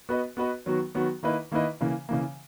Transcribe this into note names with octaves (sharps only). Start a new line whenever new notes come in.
B3 F#4 B4 D#5
B3 F#4 B4 D#5
D#3 F#3 B3 F#4
D#3 F#3 B3 F#4
D#3 A#3 E4 B4 D#5
D#3 A#3 E4 B4 D#5
C#3 E3 A#3
C#3 E3 A#3